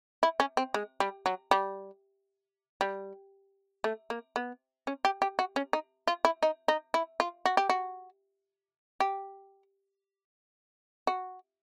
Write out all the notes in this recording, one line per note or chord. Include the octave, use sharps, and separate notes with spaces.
E4
C#4
C4
G#3
G3
F#3
G3
G3
A3
A#3
B3
C#4
G4
G4
F#4
C#4
D#4
F4
E4
D#4
D#4
E4
F4
F#4
G4
F#4
G4
F#4